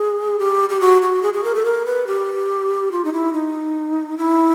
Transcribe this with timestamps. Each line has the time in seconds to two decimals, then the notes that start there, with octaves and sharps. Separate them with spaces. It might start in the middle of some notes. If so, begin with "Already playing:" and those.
Already playing: G#4
0.39 G4
0.70 G4
0.81 F#4
1.02 F#4
1.23 G#4
1.34 G#4
1.44 A#4
1.55 A4
1.65 A#4
1.86 B4
2.07 G4
2.92 F4
3.05 D#4
3.13 E4
3.33 D#4
4.18 E4